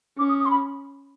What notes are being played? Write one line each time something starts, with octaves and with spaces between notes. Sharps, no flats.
C#4 D6
D#6
D#6
C6
B5